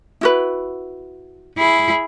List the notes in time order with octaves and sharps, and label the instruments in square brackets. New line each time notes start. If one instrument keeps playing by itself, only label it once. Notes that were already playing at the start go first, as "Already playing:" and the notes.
[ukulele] E4 F#4 B4
[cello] E4 G#4